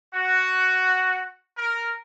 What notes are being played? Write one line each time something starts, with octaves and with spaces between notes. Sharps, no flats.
F#4
A#4